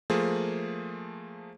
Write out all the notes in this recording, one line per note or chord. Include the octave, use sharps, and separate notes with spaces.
F3 A3 A#3 G#4 C5